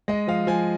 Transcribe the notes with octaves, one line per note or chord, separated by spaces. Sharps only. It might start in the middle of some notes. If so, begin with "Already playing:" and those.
G#3 D#5
F3 F5
F3 G#5